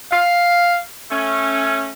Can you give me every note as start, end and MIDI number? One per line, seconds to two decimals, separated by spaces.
0.11 0.78 77
1.11 1.92 57
1.11 1.92 61